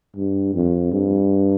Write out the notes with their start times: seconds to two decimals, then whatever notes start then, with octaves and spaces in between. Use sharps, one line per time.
0.16 G2
0.54 F2
0.92 G2